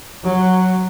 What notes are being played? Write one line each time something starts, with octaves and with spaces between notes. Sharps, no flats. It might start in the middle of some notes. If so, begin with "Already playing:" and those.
F#3